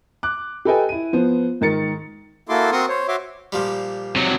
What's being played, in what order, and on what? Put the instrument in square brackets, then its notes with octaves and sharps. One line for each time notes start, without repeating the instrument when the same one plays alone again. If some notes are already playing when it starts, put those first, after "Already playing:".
[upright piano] D6 F#6
G4 A4 B4 D#5 G5 G#5
E4 D#7
F3 B3 C5
G#2 D#3 A#4 A6 C#7
[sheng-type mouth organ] A#3 E4 F#4 A4 C6 D6
C4 F#4 A#4 C6 C#6 D#6
C5 C#5
F#4 C#5 E5 C6 D6
[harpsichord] A#2 F3 G3
[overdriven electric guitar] C3 F#3